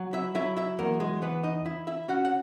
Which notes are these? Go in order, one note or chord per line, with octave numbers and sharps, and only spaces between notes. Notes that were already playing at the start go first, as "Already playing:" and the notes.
Already playing: F#3
E4 E5
F#3 E4 E5
E4 E5
E2 A#3 A#4
G#3 G#4
E3 B3 B4
D#4 D#5
E4
E4 E5
C#4 F#4 F#5
F#5